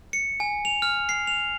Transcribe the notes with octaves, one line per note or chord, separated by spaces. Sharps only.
C#7
G#5
F7
F6
C7
F7